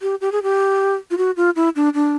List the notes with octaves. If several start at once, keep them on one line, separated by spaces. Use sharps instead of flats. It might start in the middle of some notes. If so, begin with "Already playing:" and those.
G4
G4
G#4
G4
F4
F#4
F4
E4
D4
D4